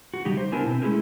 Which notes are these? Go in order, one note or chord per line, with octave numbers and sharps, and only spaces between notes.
F#4
C#3 G3 D#4 G4
C5
B3 D4 E4 A#4 G#5 A5
B2 C4
G#3 A3 C#4 E4 G#4 A#4